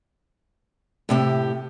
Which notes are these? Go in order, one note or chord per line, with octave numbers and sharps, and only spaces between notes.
A2 C3 G4